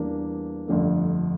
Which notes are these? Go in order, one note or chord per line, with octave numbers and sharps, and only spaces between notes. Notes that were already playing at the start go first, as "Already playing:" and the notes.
Already playing: E2 E3 G3 A#3 D4
G1 F2 D3 A3